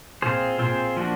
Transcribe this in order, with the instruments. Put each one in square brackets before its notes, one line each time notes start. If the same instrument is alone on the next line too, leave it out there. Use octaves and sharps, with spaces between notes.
[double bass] A#2 [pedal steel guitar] C4 F4 G#4 C5
[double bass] A#2 [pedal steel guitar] C4 F4 G#4 C5
[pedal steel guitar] F3 A#3 D4 F#4